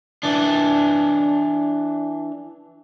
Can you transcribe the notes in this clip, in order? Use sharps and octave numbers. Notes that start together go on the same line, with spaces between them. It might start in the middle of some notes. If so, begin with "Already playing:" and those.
E3 D4